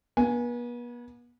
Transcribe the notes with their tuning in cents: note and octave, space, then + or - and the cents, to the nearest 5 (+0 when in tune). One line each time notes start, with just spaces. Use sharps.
B3 -40 G#5 +0